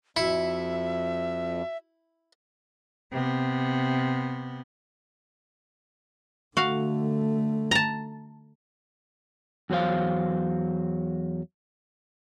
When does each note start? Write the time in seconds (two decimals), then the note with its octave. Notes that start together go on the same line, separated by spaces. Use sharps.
0.17 F2 E4 F#4 E5 E6 C#7
3.12 C3 B3
6.57 D3 A3 F#4 F5
7.71 A5 A#5
9.70 E2 F#3 A3 C5 F5